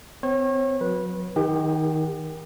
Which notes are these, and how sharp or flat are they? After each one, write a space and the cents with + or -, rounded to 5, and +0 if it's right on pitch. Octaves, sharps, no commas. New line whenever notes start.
C4 -30 C#5 -35
F#3 -30 B4 -20
D#3 +15 G4 +35 F#5 +45